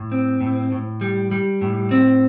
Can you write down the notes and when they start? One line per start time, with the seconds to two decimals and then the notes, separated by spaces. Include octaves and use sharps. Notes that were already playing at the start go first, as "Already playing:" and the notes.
Already playing: A2
0.12 C4
0.41 A2
0.72 A2
1.01 G3
1.31 G3
1.61 A2
1.91 C4